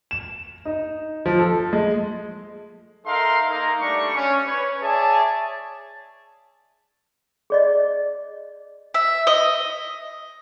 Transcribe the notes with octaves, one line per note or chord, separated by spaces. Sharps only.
E7
D#4
F3
A4
G#3
D#4 A4 A#4 E5 F5 C6
A#3 D#4 A#5
G3 A3 D4 D5 C#6
C#4
B4 C#5
G#4 C#5 D5 E5 A5
G#4 D5 D#5
E5
D#5